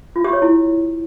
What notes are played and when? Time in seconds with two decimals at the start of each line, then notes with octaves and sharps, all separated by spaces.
0.16 F4
0.24 G4
0.33 C#5
0.42 E4